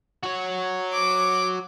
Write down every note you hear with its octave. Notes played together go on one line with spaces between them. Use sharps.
F#4 C#5
D6